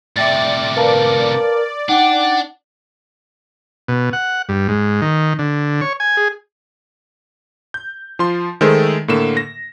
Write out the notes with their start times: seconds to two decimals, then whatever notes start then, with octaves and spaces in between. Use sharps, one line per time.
0.16 A2 C3 D5 E5 G5 A6
0.77 A#4 B4 F5 A5
1.89 D4 D#4 F#5 G5 D6
3.88 B2
4.13 F#5
4.49 G2
4.68 G#2
5.02 D#3
5.39 D3
5.81 C#5
6.00 G#5
6.17 G#4
7.74 G6
8.19 F3 F4 C6
8.61 D#3 G#3 A3 G#4 A4 C5
9.08 A2 D3 A#3 E7
9.37 A#6